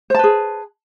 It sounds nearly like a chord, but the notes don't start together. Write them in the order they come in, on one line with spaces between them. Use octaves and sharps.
C5 A5 B4 G#4